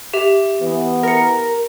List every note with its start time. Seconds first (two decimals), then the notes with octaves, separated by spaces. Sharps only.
0.14 G4 E5 F7
0.61 E3 B3
1.03 A#4 A#6 C#7